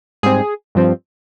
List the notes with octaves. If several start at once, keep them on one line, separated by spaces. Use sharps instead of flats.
G#2 G3 C4 G#4
G2 F3 C4